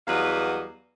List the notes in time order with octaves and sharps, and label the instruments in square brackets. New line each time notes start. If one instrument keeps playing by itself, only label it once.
[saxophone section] E2 F#3 G3 B4 D#5 F5